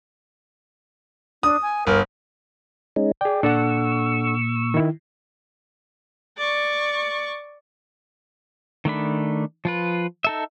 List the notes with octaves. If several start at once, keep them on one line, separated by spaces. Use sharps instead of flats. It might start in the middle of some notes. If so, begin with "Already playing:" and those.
D4 D#6
G#5
G1 A#4
G#3 C#4 D#4
G#4 D5 G5
A#2 D4 A4 F#5 C#6 E6
D#3 E4
D5 C#6
D#3 A3 D4 B5
F3 F4 B4
D#4 A4 E5